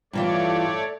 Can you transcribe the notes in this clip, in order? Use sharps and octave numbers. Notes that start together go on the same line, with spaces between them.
G2 E3 A3 F4 C#5 D5